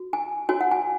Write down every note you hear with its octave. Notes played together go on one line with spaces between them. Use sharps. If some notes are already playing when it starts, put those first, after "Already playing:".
Already playing: F#4
G#5
F#4 C#5 G#5
F#5
G#5